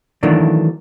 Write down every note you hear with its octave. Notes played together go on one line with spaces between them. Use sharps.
D#3 E3 F#3 A3 A#3 D4